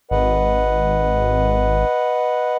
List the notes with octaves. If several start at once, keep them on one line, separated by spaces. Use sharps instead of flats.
G#1 B4 D#5 F#5